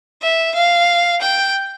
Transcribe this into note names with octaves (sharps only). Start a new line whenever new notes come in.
E5
F5
G5